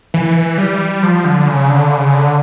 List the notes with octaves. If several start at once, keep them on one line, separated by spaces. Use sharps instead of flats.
E3
G3
F3
D3
C#3
D3
C#3
D3